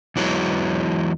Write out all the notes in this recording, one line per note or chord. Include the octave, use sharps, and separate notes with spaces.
E2 E3 F#3 G#3